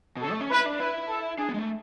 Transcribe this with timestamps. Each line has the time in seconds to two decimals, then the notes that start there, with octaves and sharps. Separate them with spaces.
0.17 B2
0.22 C#3 A4
0.31 A3
0.41 C#4
0.51 E4 B4
0.65 D4
0.80 E4 B4
1.09 A4
1.38 D4 G#4
1.49 B3
1.54 G#3
1.59 A3